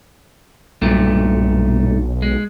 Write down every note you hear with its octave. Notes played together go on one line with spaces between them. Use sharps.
B1 G2 A#2 A3
G#3